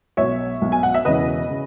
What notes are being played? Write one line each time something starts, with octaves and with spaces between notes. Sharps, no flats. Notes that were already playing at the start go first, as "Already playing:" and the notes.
B1 B2 F#3 C#5 E5
B1 B2 F#3
G#5
F#5
E5
E1 E2 C#3 B4 D#5
C#3